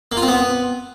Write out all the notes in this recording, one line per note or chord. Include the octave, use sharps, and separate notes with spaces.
A#3
F4
C4
B3